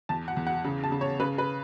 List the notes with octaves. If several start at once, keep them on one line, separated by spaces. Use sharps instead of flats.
E2 A5
F#5
E2
F#5
C#3
A5
C#3
C#5
C#3 B4
B4